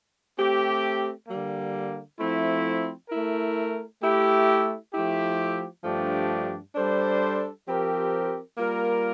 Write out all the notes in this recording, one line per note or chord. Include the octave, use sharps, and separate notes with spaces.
A3 C4 G4
D3 G3 A#3
F3 A3 C4 E4
A3 E4 A#4
A3 E4 G4
F3 A3 E4 G4
G2 F3 A3 D4 G4
G3 D4 A4 C5
F3 C4 G4 A#4
G3 A#3 F4 A#4